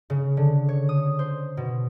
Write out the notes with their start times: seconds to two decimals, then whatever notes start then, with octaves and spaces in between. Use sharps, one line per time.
0.10 C#3
0.37 D3
0.69 C#5
0.89 D#6
1.19 C5
1.57 B2